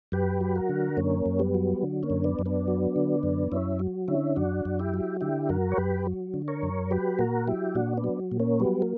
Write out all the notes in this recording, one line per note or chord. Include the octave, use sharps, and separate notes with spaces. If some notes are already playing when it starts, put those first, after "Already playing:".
F#2 G4 B4
F#3
F#4 A#4
D3
F#2 A#3 C#4
F#2
G3 B3
F#3
D3
A#3 C#4
F#2
B3 D4
F#2
B3 D4
F#3
D3
F#2
F#2 C#4 E4
F#3
D3 C#4 E4
F#2 D4 F#4
F#2
E4 G4
F#3
D3 E4 G4
F#2 F#4 A#4
C#5
F#2 G4 B4
F#3
D3
A#4 C#5
F#2
F#3 G4 B4
A#2 F#4 A#4
F#3 E4 G4
A#2 D4 F#4
B3 D4
F#3
A#2
A#3 C#4
F#3 G3 B3
A#3